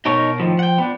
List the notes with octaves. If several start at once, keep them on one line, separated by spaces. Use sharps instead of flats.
B2 D#4 A#4 C#5
A2 D#3 F3
F#5 G5
B3 D4